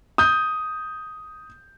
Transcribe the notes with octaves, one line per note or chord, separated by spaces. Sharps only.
D#6 G6